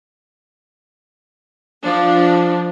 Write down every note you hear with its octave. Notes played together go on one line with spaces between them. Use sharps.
F3 D4